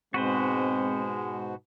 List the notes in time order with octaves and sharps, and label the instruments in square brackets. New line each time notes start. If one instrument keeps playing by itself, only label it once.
[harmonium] G#2 B2 [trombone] G#3 [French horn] C4 [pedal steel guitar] F#4 B4 C5